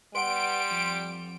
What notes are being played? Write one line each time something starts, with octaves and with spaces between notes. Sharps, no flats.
G3 B4 F#5 C6 D7
F2